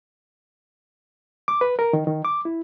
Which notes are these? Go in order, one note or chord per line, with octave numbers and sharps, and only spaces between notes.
D6
B4
A#4
D#3
D#3
D6
E4